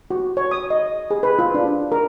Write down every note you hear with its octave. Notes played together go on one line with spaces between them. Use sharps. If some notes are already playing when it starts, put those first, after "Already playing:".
F#4
C#5
D#6
D#5
G#4
B4
F4
D4
A#4